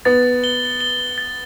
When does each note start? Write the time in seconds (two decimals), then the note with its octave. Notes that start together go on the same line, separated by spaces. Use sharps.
0.05 B3 A6
0.44 G7
0.81 G7
1.18 A6